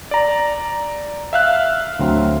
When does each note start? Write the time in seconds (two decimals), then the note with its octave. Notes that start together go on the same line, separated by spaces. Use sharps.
0.11 D5 A#5
1.33 E5 F5 F#6
1.99 D2 F#3 C4